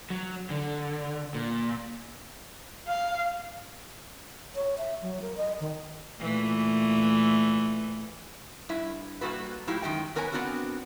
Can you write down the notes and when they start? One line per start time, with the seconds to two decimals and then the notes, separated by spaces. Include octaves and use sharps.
0.10 F#3
0.50 D3
1.35 A#2
2.87 F5
4.55 C#5
4.78 E5
5.02 F#3
5.22 A#4
5.37 D#5
5.60 D#3
6.19 A#2 E3 A3
8.69 G2 E4 E5
9.21 G3 A#3 F#4 A4 B4
9.67 A2 F#3 E4 F4 G4
9.82 F#2 D#3 G#3 E5 G5
10.15 B3 A#4 B4 C#5 G#5
10.32 B3 C4 D4 F#4 A#4